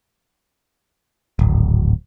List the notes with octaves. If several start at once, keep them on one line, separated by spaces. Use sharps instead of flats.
D1 G#1